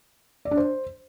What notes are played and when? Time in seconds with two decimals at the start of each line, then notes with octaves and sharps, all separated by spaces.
0.45 D5
0.51 D4
0.57 C5